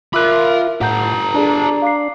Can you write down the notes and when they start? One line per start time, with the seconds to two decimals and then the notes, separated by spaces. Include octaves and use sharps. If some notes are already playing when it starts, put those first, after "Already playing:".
0.14 F4 A#4 E5 B5 D6 E6 F#6
0.81 A2 G4 A4 F#5 A#5 G6
1.34 D4 G#4 D5 A5
1.82 F5 D6 C7